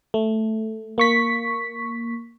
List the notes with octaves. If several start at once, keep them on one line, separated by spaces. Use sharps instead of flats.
A3
A#3 C#6 B6